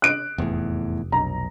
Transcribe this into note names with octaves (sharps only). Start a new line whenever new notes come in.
F#6 D7
F1 E2 A2
B1 A#5